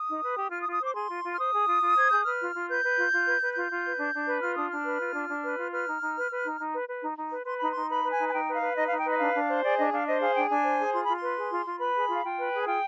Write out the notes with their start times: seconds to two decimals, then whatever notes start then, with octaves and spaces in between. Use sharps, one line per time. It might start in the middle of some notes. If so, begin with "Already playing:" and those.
Already playing: D#6
0.09 D#4
0.23 B4
0.37 G4
0.51 F4 F6
0.62 D#6
0.67 F4
0.73 D#6
0.81 C5 D6
0.94 G#4 C6
1.10 F4
1.24 F4
1.33 F6
1.38 C5 D#6
1.53 G#4
1.67 F4
1.82 F4
1.96 C5 G#6
2.11 G#4 G6
2.25 B4 F6
2.40 F4
2.54 F4
2.68 B4 G6
2.84 B4
2.98 F4
3.12 F4
3.27 B4
3.41 B4
3.55 F4 G6
3.70 F4
3.84 B4
3.99 D4
4.14 D4
4.27 B4
4.42 F4 F6
4.56 D4 D#6
4.70 D4 F6
4.85 B4
5.00 F4
5.14 D4
5.29 D4
5.43 B4
5.58 F4
5.72 B4 F6
5.87 D#4
6.01 D#4
6.16 B4
6.31 B4
6.45 D#4
6.59 D#4
6.74 B4
6.88 B4
7.02 D#4
7.18 D#4
7.31 B4
7.46 B4 C6
7.59 D#4 B5
7.71 D#4 C6
7.90 B4 B5
8.03 B4
8.12 G#5
8.18 D#4
8.28 G#5
8.33 D#4 G5
8.48 B4
8.54 F5
8.61 B4
8.76 D#4 D#5
8.87 D#4 F5
8.98 G5
9.05 B4 D#5
9.19 D4 F5
9.34 D4
9.49 C5
9.63 G#4 D5
9.77 D4 D#5
9.92 D4 F5
10.06 C5 D#5
10.21 G#4 F5
10.35 D4 G5
10.50 D4 G#5
10.64 C5
10.79 G#4
10.93 F4 C6
11.04 F4 B5
11.16 C6
11.22 B4
11.37 G#4
11.51 F4
11.66 F4
11.80 B4 B5
11.95 G#4
12.09 F4
12.14 F5
12.23 F4 G5
12.37 B4
12.53 G#4
12.61 G#5
12.67 F4 G5